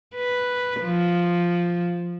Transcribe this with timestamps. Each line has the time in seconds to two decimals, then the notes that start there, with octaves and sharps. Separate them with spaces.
0.16 B4
0.82 F3